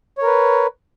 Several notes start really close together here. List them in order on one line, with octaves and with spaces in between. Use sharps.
C#5 A#4 B4